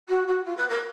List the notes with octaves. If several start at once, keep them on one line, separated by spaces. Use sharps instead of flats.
F#4
F#4
F4
B4
A#4